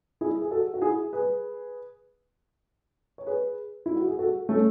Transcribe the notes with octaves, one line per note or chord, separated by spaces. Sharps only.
E4 G#4
G#4
F#4 A4
F#4
E4 G#4
G#4 B4
C#5
G#4 B4
E4
F#4
G#4
F#4 A4
A3 C#4